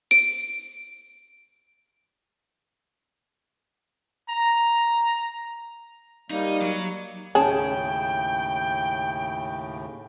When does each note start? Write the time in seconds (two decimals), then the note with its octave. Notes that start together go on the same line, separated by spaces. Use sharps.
0.11 D7
4.30 A#5
6.31 G3 A#3 D#4
6.62 F#3
7.35 D#2 A2 C#3 C#4 G#4 G5 A5